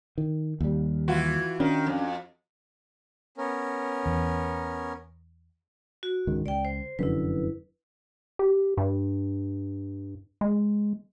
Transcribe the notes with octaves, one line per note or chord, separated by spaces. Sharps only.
D#3
D#2 G3
E3 F4 F#4
D#3 C#4 D4
F2
B3 C#4 A#4
E2
F#4
C#2 G#2 D#3
C#2 D5 G5
C5
F1 F#2 D3 E4 B4
G4
G2
G#3